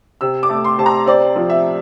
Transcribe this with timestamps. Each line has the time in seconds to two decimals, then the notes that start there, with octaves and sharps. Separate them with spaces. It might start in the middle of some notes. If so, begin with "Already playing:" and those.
0.21 C3 E6
0.43 D6
0.49 A3
0.64 C6
0.78 C3 A5
0.86 A#5
1.06 C4 D5
1.36 F3
1.50 E5